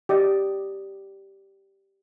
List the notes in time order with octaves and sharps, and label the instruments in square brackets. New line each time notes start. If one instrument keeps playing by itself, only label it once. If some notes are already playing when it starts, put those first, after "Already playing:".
[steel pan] G4 D5 D#5